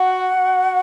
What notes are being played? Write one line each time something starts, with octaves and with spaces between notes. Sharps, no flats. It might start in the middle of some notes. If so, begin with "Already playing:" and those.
Already playing: F#4 F#5
F#4